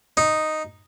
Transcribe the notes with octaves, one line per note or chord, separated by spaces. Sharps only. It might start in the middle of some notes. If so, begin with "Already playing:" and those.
D#4